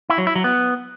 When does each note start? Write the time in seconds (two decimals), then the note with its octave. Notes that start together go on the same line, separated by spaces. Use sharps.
0.10 E4
0.18 F#3
0.27 E4
0.36 F#3
0.44 B3